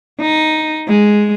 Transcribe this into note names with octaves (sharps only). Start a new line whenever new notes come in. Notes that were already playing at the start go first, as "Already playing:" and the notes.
D#4
G#3